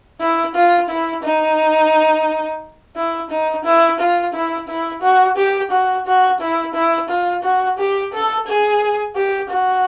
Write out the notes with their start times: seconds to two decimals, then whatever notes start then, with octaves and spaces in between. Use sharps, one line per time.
0.20 E4
0.55 F4
0.89 E4
1.23 D#4
2.96 E4
3.30 D#4
3.64 E4
4.00 F4
4.33 E4
4.68 E4
5.02 F#4
5.37 G4
5.71 F#4
6.06 F#4
6.40 E4
6.74 E4
7.09 F4
7.43 F#4
7.78 G4
8.13 A4
8.47 G#4
9.16 G4
9.50 F#4